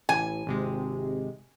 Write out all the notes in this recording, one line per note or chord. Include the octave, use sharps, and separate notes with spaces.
A1 G#5
G#1 C3 G#3